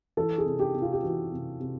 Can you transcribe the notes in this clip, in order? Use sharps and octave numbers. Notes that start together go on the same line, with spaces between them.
E3 A4
G#4
C3
G4
C3
F4
G4
E3 F#4
C3
C3